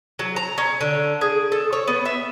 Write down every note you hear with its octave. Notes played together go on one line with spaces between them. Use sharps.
F#3
A#5
C#4
D3
G#4
A4
C#5
B3
E5